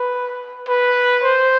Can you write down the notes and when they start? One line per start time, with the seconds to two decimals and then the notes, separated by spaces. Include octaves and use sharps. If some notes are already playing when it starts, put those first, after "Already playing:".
Already playing: B4
0.68 B4
1.23 C5